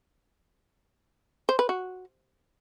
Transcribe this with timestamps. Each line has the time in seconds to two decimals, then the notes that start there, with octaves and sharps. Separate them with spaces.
1.49 C5
1.59 B4
1.69 F#4